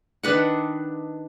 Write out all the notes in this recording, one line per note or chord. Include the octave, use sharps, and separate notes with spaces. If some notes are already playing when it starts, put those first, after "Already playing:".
D#3 D4 B4 F#5